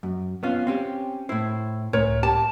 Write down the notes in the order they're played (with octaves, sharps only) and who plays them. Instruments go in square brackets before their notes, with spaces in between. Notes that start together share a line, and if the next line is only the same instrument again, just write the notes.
[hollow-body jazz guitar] F#2
B3 C#4 F4
C4 C#4 G4
[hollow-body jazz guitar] A2 C5 [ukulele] E4
[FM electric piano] C#2 A2 [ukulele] A#4 C#5
[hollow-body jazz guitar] G4 [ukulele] A5